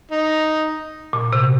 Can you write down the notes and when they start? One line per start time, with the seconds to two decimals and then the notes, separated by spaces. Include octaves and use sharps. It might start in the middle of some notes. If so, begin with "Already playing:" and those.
0.11 D#4
1.13 A#2
1.33 C3